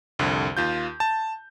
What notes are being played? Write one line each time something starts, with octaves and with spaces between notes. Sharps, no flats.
C2 F2 D3
D#2 F4 G6
A5